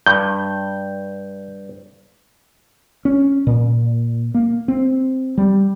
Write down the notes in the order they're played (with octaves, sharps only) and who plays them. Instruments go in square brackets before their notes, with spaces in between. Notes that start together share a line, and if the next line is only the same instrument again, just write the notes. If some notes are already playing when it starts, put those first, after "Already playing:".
[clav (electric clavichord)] G2 [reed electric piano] G6
[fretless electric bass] C#4
A#2
A#3
C4
G3